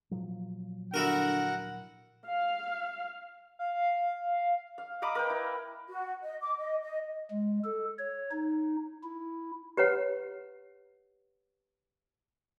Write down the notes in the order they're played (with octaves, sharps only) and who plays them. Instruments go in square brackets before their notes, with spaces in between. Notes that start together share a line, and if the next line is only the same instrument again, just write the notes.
[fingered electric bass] A#2 F3 F#3
[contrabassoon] D3 [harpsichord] E4 F#4 A#4 [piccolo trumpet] F#5
[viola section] F5
[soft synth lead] F5
[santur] F5
D#5 A#5 B5 D6
A#4 B4 G5
E4
[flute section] F#4
D#5
D6
D#5
D#5
[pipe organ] G#3
A4
C#5
D#4
E4
[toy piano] G4 B4 C#5 F#5